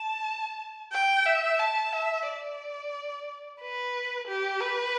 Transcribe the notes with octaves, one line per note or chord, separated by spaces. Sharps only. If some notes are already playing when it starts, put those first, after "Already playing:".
Already playing: A5
G5
E5
A5
E5
D5
B4
G4
B4